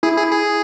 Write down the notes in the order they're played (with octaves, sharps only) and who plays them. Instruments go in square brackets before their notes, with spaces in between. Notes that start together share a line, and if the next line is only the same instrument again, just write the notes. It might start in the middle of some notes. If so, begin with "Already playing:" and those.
[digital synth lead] E4 [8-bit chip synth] G#4
[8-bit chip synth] G#4
G#4